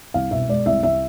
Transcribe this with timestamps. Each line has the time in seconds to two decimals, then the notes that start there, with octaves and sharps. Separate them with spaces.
0.14 C2 F5
0.31 B2 E5
0.48 G#3 D5
0.66 C2 E5
0.83 C2 E5